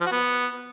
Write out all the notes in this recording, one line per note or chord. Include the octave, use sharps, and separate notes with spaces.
F3
F#4
B3